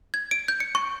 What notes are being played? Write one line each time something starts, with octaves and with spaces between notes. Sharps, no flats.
G#6
D7
G6
C#7
C#6